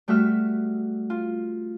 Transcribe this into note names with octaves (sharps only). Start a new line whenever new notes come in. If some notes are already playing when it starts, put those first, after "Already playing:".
G3 A3 F#4 E5 E6 F6
F4